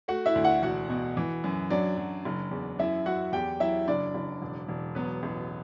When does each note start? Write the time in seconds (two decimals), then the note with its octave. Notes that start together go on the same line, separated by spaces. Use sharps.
0.08 A3 F#4 F#5
0.26 E4 E5
0.35 D2
0.44 F#4 F#5
0.62 E1 F#4 F#5
0.89 B2
1.17 E3
1.44 F#2
1.70 F#3 D4 D5
1.97 F#3
2.25 F#1
2.51 E2
2.79 F#2 E4 E5
3.06 F#2 F#4 F#5
3.33 E2 G4 G5
3.60 F#3 E4 E5
3.88 F#1 D4 D5
4.14 F#1
4.42 E1
4.68 E1
4.95 F#3 B3 B4
5.23 A1